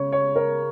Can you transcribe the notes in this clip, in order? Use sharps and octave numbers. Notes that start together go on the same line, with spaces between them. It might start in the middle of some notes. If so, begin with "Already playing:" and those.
Already playing: C#3 C#5
C#5
A#4